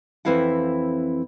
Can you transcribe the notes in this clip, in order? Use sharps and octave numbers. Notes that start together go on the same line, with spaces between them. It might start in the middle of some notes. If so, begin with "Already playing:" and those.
F2 E3 C4 E4 F5 F#5